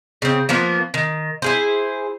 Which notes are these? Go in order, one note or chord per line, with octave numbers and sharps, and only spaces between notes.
C#3 C4
F3 A#3 B3
D#3
E4 G#4 C5